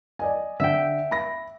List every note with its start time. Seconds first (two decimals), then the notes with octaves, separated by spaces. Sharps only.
0.19 D5 D#5 G#5
0.60 D3 E5 G5
1.11 B5 A#6